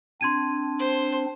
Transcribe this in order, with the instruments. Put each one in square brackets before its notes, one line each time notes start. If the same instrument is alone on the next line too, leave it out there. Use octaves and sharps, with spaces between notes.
[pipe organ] C4 D4 [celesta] C6 G#6 D#7
[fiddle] C5